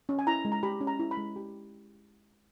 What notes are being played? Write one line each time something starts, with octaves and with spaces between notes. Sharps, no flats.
C#4
G#5
E4 A#5
G#3
A#5
G4 B5
C#4
A#5
E4
B5
G#3
G4